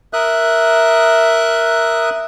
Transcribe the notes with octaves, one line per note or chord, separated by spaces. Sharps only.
A#4 E5 D#6 F#6